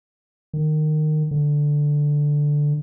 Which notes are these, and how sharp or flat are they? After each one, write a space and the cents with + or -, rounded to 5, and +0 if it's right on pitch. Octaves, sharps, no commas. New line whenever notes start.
D#3 -20
D3 +0